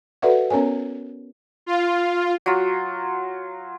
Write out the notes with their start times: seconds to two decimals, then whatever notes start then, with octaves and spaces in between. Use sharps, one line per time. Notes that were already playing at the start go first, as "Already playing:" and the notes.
0.22 F#4 A4 B4 D5 E5 F#5
0.50 B3 C#4 A#4 C#5 G#5
1.66 F4
2.46 F#3 F4